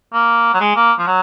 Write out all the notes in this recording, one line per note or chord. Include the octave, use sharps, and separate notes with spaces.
A#3
F#3
G#3
A#3
F3
F#3